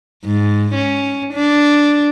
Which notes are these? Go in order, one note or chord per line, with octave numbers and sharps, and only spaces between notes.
G#2
C#4
D4